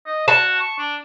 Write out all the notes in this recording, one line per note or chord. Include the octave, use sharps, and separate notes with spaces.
D#5
F#4 A5
C#6
D4